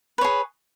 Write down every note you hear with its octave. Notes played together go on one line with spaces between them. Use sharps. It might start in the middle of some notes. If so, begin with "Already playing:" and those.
G#4 B4 C#5